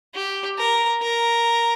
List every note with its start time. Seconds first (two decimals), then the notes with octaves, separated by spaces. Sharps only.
0.15 G4
0.58 A#4
1.02 A#4